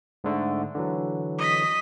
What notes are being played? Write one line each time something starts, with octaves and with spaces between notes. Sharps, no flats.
G#2 D3 A3
D3 E3 F#3
D#5 B6